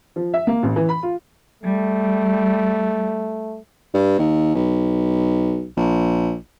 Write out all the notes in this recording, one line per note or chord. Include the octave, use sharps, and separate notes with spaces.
F3
E5
A#3
A1
E3
B5
F4
G3 A3
G2
D#2
B1
A#1